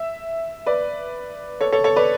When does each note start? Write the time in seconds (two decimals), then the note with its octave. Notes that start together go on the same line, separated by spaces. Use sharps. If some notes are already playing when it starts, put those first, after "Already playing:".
Already playing: E5
0.66 B4 D5
1.61 A4 C#5
1.72 A4 C#5
1.84 A4 C#5
1.96 B4 D5